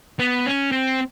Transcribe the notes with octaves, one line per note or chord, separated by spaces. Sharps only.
B3
C#4
C4